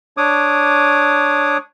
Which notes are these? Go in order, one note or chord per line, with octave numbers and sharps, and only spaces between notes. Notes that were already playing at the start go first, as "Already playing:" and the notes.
D4 C#5 D6 D#6